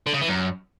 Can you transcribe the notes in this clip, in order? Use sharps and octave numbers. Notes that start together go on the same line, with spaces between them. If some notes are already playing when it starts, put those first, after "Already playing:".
D3
C#3
E3
F#2